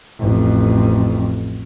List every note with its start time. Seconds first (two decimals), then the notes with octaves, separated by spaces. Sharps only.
0.20 A1 F2